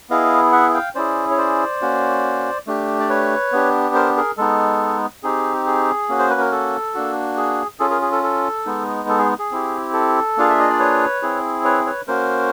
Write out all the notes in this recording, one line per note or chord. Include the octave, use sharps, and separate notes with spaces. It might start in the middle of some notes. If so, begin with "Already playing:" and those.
B3 E4 G#4 D#5 F5
E5 F#5
F5 G5
C#4 E4 G#4 C5 D5
C#5
C5 D5
A#3 C#4 F#4
A3 D4 G4
D5
B4 C#5
B3 D4 G4
A#4 C5
G#4 A#4
G#3 B3 D#4 A4
C4 D#4 G4 G#4
G#4
A#3 C#4 F#4
C5
B4
A#4
A4
A#3 D4 F#4
G#4
C#4 F4 G#4 A4
G#4 A#4
G#4
A4
A4
G#3 B3 D#4
A4
G#4
G#4
C4 E4 G4
A4
A#3 D4 F4 G#4 F5
E5
D#5
D5
B4 C#5
C4 E4 G#4
B4 C#5
B4 C#5
A#3 C#4 F#4 A#4 C5